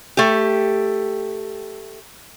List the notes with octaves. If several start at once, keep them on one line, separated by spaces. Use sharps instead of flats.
A3 G4